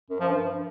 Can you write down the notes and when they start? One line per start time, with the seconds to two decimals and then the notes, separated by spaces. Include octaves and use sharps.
0.10 F#2
0.20 F3
0.29 G2